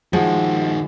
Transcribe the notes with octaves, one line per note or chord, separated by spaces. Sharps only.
D#3 F3 G#3 F#4